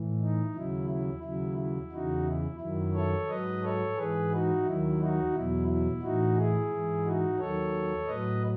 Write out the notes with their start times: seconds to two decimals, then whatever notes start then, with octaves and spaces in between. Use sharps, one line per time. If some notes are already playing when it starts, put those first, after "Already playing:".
Already playing: A2 E3
0.21 D#4
0.55 D#2 C#3 F#3 E4
0.90 E4
1.24 D#2 C#3 F#3 E4
1.58 E4
1.92 E2 C#3 E3 D#4 F#4
2.26 E4
2.60 F#2 D#3 F#3 E4
2.95 A4 C#5
3.29 G#2 F#3 B4 D#5
3.62 A4 C#5
3.97 G#2 E3 G#4 B4
4.31 D#4 F#4
4.65 D#2 D#3 F#3 E4
4.99 D#4 F#4
5.34 E2 B2 F#3 E4
5.68 E4
6.02 A2 E3 D#4 F#4
6.37 E4 G#4
6.70 G#2 E3
7.04 D#4 F#4
7.39 D#2 D#3 F#3 A4 C#5
8.07 A2 F#3 B4 D#5